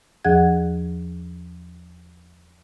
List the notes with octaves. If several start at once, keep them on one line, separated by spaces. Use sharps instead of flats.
E2 F3 G#4 F#5 G#6